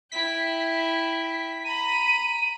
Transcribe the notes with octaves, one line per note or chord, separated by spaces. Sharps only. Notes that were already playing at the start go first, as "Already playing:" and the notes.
E4 G5 B6
A#5 B5 D#7